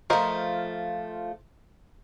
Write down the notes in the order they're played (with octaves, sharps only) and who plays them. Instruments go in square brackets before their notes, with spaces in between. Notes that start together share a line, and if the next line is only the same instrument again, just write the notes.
[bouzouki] F3 A3 [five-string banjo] A#4 C5 D#5